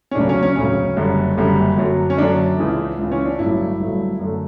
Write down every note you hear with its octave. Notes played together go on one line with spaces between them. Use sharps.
C#4
E1 D2 C#3 F#3 D4
C#4
C#4
E1 D2 C#3 F#3 C#4
F#1 F#2 D3 G3
F#1 F#2 D3 G3
F#2 D3 F#3
C#4
F#2 D3 F#3 D4
C#2 C#3 E3
C#2 C#3 E3
C#4
D4
G1 G2 F#3 A3 E4
G1 G2 F#3 A3
F#2 D3 A3